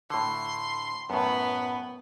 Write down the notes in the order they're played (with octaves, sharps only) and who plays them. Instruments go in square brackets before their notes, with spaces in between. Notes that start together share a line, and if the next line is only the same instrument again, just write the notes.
[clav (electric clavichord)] A2 D3 [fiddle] C6
[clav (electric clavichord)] F#2 A2 [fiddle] B3 B4